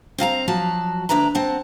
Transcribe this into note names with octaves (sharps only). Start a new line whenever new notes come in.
C4 F5 A5 A#5
F3 F#3 F#4 A5
D2 G#2 D4 B4 E5 A#5
C4 F#5 A5